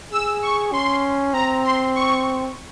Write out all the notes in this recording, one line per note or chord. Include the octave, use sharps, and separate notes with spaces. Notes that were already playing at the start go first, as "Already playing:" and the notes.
G#4 E6
C#6
C#4 C6
C4 A#5
C6
C#6